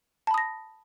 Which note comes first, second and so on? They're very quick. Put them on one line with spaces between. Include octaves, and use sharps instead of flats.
A5 B5 D#6 A#6